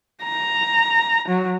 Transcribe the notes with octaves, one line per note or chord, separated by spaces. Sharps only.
A#5
F#3